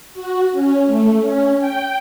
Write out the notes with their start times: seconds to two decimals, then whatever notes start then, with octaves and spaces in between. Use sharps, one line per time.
0.14 F#4
0.51 C#4
0.86 A3
1.20 C#4
1.59 G5